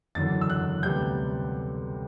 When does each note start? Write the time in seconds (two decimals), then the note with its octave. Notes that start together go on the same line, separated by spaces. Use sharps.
0.15 F#1 E2 D3 F#3 A6
0.41 E6
0.50 F#6
0.83 D2 C3 G3 B3 G6